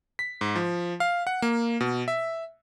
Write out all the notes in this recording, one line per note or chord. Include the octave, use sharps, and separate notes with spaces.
B6
G#2
F3
F5
F#5
A#3
B2
E5